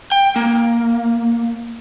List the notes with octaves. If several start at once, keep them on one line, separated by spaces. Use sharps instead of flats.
G5
A#3